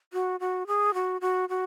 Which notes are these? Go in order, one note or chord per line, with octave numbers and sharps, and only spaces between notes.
F#4
F#4
G#4
F#4
F#4
F#4